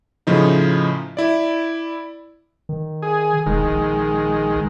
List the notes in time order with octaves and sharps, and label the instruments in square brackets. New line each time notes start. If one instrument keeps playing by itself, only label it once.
[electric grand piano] A2 C#3 F3 D#4
E4 D5
[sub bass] D#3
[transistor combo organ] G#4
[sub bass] E1 [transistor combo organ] D#3 G#3
[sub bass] A#1